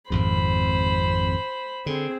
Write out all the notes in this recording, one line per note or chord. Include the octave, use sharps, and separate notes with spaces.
G#1 F2 G#2 C5 B5
D3 C4 G#4